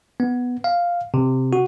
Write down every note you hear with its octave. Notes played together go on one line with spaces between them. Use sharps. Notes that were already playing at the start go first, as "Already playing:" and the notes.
B3
F5
C3
F#4